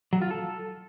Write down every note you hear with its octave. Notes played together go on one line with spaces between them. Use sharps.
F#3
F4
A4